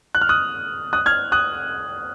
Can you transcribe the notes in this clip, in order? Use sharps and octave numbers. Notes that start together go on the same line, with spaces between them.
F#6
F6
D#6 F#6
D#6 F#6
F6 G#6
D#6 F#6